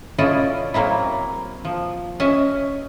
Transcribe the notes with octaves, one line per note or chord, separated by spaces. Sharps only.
C#4 E4 F4 A4 D5 D#5
F#3 A#3 C4 E4
F3
C#4 D#5 E5